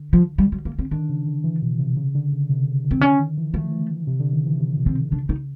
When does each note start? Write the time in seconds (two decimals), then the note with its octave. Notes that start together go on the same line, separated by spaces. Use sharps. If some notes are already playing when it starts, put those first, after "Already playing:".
Already playing: D3
0.13 F3
0.38 G3
0.52 F#3
0.65 A#3
0.79 C4
0.91 D#3 D4
1.09 C#3
1.26 D3
1.44 E3
1.62 B2
1.79 C3
1.97 C#3
2.15 D3
2.32 C#3
2.49 C3
2.67 C#3
2.85 D3
2.91 C4
2.96 D#3
3.01 D3 C#4
3.19 D#3
3.37 E3
3.54 F3 A3
3.72 E3
4.07 C3
4.19 D3
4.33 D#3
4.46 E3
4.60 C3
4.77 B2
4.86 C4
5.12 C#3 D4
5.29 D#4